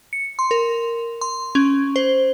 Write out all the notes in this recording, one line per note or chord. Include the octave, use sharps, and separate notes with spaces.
C#7
C6
A#4
C6
C#4
C5